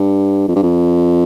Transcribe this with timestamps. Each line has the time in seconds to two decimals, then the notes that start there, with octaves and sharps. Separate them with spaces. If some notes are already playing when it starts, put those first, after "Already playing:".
Already playing: G2
0.48 F2
0.56 G2
0.63 F2